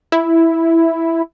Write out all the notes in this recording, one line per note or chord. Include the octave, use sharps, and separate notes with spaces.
E4